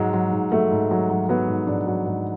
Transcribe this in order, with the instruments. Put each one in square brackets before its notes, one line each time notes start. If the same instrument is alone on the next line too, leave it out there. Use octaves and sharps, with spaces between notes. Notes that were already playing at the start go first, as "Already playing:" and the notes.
Already playing: [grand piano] G#2 F#3 G#3
F#3
G#2
F#3 A3
G#2
F#3
F#3
F#3 B3
G#2
G#2 D4
F#3
G#2